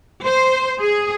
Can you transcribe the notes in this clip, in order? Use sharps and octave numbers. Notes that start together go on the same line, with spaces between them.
C5
G#4